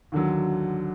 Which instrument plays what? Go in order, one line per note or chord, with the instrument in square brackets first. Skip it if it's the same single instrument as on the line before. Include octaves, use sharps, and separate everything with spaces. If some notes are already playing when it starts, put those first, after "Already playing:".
[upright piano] D#2 D3 F#3